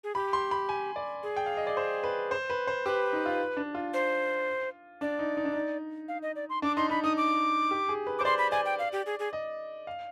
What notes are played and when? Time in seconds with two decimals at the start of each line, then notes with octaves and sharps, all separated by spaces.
0.04 G#4
0.15 G4 B5
0.33 C6
0.51 B5
0.69 G#5
0.96 D5
1.23 G#4
1.36 G5
1.46 F5
1.57 D#5
1.67 D5
1.77 C5
2.04 B4
2.31 C5
2.50 B4
2.67 C5
2.86 G4 B4
3.13 D#4
3.26 F4
3.57 D4
3.75 F4
3.94 C5
5.01 D4 D5
5.19 D#4
5.37 D#4
5.45 D4
5.53 D#4
6.08 F5
6.22 D#5
6.36 D5
6.50 C6
6.62 D4 D6
6.77 D#4 C6
6.90 D#4 B5
7.04 D#4 D#6
7.17 D6
7.71 G4
7.89 G#4
8.07 B4
8.19 C5 D6
8.25 D5 C6
8.38 B5
8.51 D5 G#5
8.65 G5
8.79 F5
8.92 G4
9.06 G#4
9.19 G#4
9.33 D#5
9.87 F5